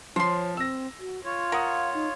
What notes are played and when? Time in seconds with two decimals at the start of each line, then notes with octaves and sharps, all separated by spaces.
0.16 F3 C5 C#5 C6
0.57 C4 E6 A#6
0.99 F#4
1.25 F4 C#5 C#6
1.52 A#4 F5 F#5 A#5 D#6
1.94 D#4